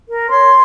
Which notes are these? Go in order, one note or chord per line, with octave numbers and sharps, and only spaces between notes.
A#4
C#5 C6